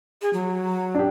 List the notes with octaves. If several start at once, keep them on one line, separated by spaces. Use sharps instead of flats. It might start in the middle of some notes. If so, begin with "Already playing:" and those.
G#4
F#3
D4 G4